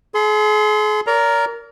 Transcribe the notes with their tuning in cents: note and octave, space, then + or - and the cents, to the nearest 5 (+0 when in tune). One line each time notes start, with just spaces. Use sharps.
G#4 +40 C6 -20
A#4 +0 D5 -45 A#5 +0